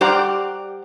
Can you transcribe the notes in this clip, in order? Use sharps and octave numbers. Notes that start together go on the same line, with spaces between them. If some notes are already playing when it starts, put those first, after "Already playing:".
G3 G4 C5 D5 F#5 A#5